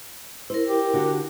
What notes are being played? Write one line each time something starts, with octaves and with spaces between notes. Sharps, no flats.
E4 A#4 C5
G4
D3 F#4